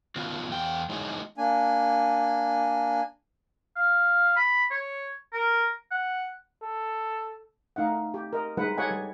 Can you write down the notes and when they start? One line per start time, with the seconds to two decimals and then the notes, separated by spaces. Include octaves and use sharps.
0.16 D#3 B3 F4 F#4
0.51 E2 G5
0.89 G#3 D#4 E4 F#4 C#5 D#5
1.38 A#3 D4 G#5
3.76 F5
4.37 B5
4.71 C#5
5.33 A#4
5.91 F#5
6.62 A4
7.76 A3 D#4 F5 F#5
8.14 G4
8.33 A#4 D#5
8.57 G3 G#3 D#4 B4 F#5
8.77 G4 A4 C#5 D#5 F#5 G#5
8.91 G3